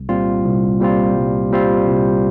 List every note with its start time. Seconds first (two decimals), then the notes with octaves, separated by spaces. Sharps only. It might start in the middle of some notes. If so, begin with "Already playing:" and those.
Already playing: C2
0.09 A#2 G3 C4 F4
0.44 C2
0.80 A#2 G3 C4 F4
1.15 C2
1.51 A#2 G3 C4 F4
1.86 C2